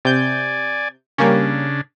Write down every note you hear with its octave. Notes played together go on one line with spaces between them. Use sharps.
C3 D5 G#5 G6
C#3 G3 A#3 C#4 D4